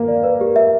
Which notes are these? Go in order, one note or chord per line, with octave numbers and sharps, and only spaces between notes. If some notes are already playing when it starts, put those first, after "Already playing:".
Already playing: A#3
D5
B4
G4
E5